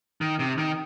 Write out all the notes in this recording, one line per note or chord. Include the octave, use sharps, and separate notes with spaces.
D#3
C3
D#3